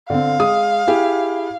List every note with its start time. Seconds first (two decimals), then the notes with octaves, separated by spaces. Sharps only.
0.10 D3 C4 F5
0.40 G#3 D#6
0.87 E4 G4 G#4